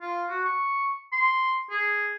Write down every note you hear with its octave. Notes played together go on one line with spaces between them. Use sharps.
F4
F#4
C#6
C6
G#4